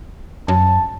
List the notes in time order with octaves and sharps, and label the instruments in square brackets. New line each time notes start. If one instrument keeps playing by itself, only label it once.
[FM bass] F#2 [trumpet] A5